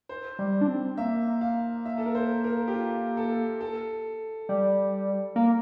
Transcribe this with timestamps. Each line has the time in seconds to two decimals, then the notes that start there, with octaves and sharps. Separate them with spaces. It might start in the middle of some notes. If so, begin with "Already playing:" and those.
0.09 C5
0.39 G3
0.61 D4
0.68 C4
0.97 A#3 E5
1.41 F5
1.85 E5
1.98 A4
2.06 A#4
2.15 C5
2.44 A#4
2.68 G4
2.73 F4
3.17 A4
3.61 A4
4.49 G3
5.36 A#3